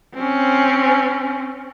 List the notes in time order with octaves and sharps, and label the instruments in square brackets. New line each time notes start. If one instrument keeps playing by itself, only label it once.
[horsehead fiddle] C4 C#4